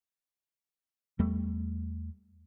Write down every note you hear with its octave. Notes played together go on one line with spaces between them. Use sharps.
E2 G3 A3